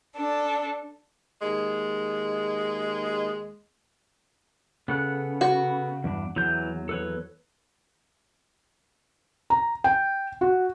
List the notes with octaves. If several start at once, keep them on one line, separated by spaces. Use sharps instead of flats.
D4 A4
D#2 G#3
C#3 B3 A4 F#6
F#4
E2 G2 D4
E2 E3 F#3 G6
A4 B4 C#5
A#5
G5
F#4